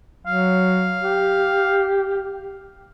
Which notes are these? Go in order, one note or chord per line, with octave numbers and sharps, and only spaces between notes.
F#3 F5
G4